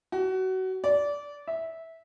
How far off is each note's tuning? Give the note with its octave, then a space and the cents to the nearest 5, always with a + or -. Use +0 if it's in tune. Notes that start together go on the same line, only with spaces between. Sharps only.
F#4 +25
D5 -20
E5 -15